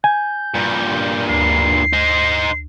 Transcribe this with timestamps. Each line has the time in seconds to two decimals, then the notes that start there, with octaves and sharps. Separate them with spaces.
0.04 G#5 G6
0.55 G2 A#2
1.28 D2 C7
1.93 D#4 C5